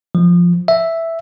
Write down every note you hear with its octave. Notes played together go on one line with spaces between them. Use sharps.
F3
E5